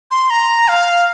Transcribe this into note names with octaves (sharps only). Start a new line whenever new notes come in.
C6
A#5
F5